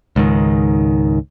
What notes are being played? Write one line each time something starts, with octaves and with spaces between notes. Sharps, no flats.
C#2 G#2 D#3